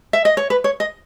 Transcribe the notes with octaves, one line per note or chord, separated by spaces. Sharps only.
E5
D#5
C#5
B4
C#5
D#5